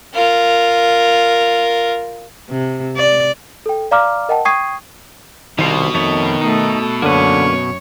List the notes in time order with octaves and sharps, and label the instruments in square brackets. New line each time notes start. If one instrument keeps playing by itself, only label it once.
[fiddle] F4 A#4
[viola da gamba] C3
D5
[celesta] A4 G5
D5 F5 A#5 D6 F6
A#4 D#5 F#5 G5 A5
G5 C#6 D#6 G#6 C7 D#7
[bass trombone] C2 [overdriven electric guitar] B2 [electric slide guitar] D#3 C5
[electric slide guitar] F2 A3 C#5 [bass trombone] D#3
[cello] A3 A4 [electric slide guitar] D#4
[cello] F#2 C#5 [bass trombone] D3 [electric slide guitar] A#3 C#4 B4